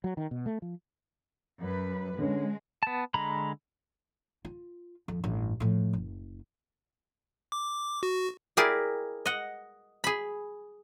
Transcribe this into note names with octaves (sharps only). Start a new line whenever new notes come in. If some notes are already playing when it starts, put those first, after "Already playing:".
F#3
D#3
B2
A3
F3
F#2 B4
D3 G#3 C#4
B3 A5
D3 G#3 A#5 B5
F4
F2
A1 G2
A2 F3
F#1
D6
F#4
E4 G4 G#4 A#4 D5
D#5 F#5
G#4 B5